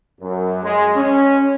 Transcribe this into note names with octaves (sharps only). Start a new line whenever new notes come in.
F#2
G#3
C#4